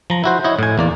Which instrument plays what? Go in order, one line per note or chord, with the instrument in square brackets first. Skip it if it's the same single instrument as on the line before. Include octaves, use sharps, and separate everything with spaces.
[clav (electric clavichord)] F3 A#5
E4 F#4 C5
E4 C#5 D#5
A2 G#5
E2 A#3 D5